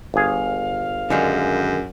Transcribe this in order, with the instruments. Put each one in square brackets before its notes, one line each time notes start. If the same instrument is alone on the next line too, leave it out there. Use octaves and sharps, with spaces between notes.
[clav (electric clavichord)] G1 G#4 [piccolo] F5
[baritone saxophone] F#2 [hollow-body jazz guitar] D3 D#3 G#3